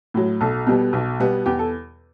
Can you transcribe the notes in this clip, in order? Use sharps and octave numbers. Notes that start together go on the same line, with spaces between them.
A2 F#3
B1 A4
B2 G3 B3
B1
B2 G3 B3
E2 G4
A4